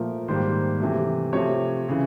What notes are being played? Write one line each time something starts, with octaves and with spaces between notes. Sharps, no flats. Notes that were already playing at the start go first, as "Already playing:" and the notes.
Already playing: A#2 F3 A3 A#4
G#2 D#3 G3 A#3 C5
C3 E3 A3
C3 F3 A3 C#5
C#3 E3